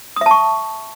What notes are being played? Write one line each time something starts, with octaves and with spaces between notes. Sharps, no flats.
E5 A5 C#6 D#6